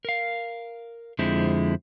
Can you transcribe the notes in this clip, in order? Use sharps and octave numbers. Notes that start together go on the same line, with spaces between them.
A#4 F5
F2 D3 F3 G#3 C4 E4